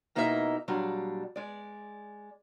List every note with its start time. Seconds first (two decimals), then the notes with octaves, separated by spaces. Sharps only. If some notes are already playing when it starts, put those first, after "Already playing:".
0.15 B2 A#3 D#4 E4 D5 E5
0.68 A#2 F#3 G3 D4
1.36 G#3 D5